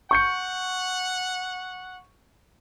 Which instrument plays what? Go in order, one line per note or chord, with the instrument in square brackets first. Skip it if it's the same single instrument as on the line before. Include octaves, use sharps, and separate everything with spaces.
[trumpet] F#5 [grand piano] C#6 G6 C#7